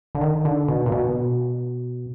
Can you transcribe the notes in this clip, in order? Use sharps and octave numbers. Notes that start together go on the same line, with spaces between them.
D3
D#3
D3
B2
A#2
B2